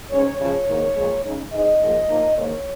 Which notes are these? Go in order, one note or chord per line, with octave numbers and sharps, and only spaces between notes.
G#2 G#3 C#4 C#5
C#3 F3 G#3 C#5
G#2 D#3 A#3 D#4
A#2 F3 G#3
C#3 G#3 D#4
G#2 G#3 D#4 D#5
G#2 F3 A#3
A#2 F3 A#3 D#4
G#2 D#3 A#3 D#4 C#5